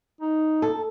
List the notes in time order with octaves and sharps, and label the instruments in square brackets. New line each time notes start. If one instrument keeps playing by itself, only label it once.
[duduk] D#4
[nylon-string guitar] A4